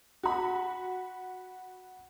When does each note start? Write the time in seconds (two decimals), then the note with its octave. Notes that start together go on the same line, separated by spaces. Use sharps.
0.23 F#4 B5